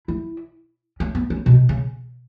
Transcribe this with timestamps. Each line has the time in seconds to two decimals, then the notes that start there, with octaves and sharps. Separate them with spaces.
0.08 E4
1.00 C#4
1.15 B3
1.30 C#4
1.46 B2
1.69 C#3